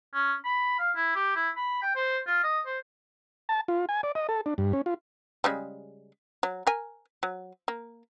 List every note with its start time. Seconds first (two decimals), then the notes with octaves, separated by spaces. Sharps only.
0.14 C#4
0.45 B5
0.79 F5
0.96 E4
1.16 G4
1.36 E4
1.57 B5
1.82 G5
1.96 C5
2.27 F4
2.44 D#5
2.66 C5
3.49 A5
3.68 F4
3.89 G#5
4.03 D5
4.15 D#5
4.29 A4
4.46 D4
4.58 G2
4.73 C#4
4.86 F4
5.44 C#3 G3 G#3
6.43 F#3
6.67 A#4 G#5
7.23 F#3
7.68 A#3